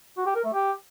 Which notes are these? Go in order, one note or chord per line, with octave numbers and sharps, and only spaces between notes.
F#4
G4
A#4
A3
G4